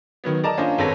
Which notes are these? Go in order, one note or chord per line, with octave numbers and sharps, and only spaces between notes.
D#3 F#3 B3
A#4 D5 D#5 A5 A#5
A#3 C#4 D4 F4 C5 D#5
G#1 C4 A4 B4 C#5 A#6